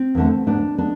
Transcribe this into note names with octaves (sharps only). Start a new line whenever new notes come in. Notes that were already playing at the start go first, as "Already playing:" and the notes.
Already playing: C4
E2 D3 A3
G#2 G#3 B3 D4
G#3 B3 D4